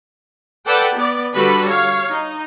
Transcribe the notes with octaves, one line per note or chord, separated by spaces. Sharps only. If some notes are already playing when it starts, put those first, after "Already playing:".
A4 B4 D5 F#5 G5 A5
B3 D5
D3 G3 F#4 A4 B4 B5
C#5 F5
D#4